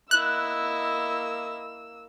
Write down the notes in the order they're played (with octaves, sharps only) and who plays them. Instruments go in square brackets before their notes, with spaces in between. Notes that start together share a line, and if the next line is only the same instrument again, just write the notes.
[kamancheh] A#3 E6 [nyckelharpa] E4 D#5 [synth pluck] F#6